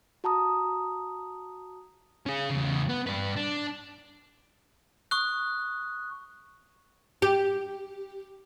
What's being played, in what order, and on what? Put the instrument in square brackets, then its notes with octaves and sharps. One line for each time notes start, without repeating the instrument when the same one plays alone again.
[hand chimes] F#4 A5 A#5 D#6
[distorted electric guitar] C#4 G#4
E2 C#3
B3
G2 B4
D4
[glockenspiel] C#6 D#6 F#6
[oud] G4